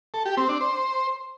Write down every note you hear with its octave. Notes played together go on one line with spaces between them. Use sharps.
A4
G4
C4
D4
C5